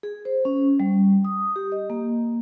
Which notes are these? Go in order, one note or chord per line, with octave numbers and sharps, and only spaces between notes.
G#4
C5
C#4
G3
D#6
G4
D#5
A#3